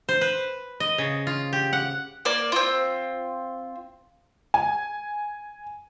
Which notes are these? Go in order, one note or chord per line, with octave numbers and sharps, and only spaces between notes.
C5
B4
D#5
C#3
F4
G4
F#5
A#3 D5
C4 F4
G#5